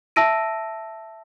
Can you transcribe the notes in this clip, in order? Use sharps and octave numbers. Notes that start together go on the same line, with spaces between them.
E5 A5 E6 A#6 D7 D#7